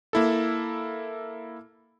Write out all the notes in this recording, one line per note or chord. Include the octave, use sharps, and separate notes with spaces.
A#3 E4 A4